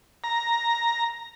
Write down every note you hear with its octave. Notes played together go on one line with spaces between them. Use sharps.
A#5